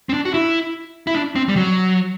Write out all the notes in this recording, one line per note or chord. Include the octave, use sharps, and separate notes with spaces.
C4
D4
F#4
E4
E4
D4
C4
G3
F#3